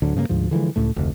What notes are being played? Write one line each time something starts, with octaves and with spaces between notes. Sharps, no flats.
D1 D2 D3 F#3
G2 C#3 G#3 A#3
D2 G#2 F3
D3 E3 F3 G#3
C#2 A2 A3
F1 D2